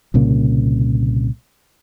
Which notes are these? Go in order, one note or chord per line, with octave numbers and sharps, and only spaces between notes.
C2 A#2 C#3 A#3